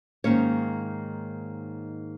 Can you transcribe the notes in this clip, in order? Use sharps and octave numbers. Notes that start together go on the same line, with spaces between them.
G#2 D#3 A#3 C#4 C#5